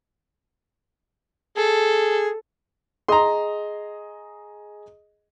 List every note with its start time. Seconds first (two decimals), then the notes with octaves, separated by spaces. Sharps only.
1.57 G#4 A4
3.08 G#4 D#5 A#5 C6 D#6